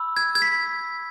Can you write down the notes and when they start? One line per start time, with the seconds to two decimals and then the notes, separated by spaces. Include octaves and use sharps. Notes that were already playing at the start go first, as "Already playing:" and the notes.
Already playing: B5 E6
0.17 G#6
0.35 G#6
0.42 B6